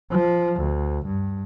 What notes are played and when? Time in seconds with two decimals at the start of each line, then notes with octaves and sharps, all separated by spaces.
0.11 F3
0.60 D2
1.06 G2